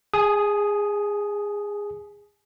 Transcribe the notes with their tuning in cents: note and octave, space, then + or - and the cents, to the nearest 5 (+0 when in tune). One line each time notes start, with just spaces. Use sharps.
G#4 -15 G#5 +40 D#6 +0